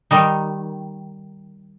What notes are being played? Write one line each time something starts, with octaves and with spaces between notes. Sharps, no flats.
D#3 G3 D#4